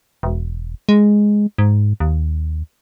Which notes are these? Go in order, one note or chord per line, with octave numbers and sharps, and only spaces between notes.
E1
G#3
G#2
D#2